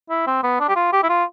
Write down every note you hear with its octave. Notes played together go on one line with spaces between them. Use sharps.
E4
C4
B3
D4
G4
F4
G4
E4
F4